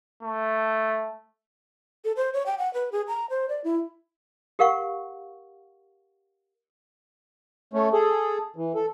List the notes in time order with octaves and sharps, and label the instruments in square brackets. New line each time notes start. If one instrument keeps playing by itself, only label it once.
[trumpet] A3
[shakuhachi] A4
C5
C#5
G5
F#5
B4
G#4
A#5
C5
D5
E4
[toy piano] G4 A#4 F5 F#5 C#6
[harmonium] A3 C#4
G#4 A4
E3
A4